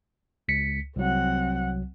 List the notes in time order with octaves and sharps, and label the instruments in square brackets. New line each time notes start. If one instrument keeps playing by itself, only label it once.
[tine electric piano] C#2 B6 C#7
[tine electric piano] C2 F#3 [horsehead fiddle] C4 F#5